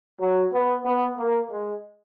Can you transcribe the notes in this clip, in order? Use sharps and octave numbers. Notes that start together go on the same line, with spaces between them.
F#3
B3
B3
A#3
G#3